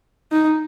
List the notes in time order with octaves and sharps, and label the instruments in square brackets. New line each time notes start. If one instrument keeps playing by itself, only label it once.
[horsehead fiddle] D#4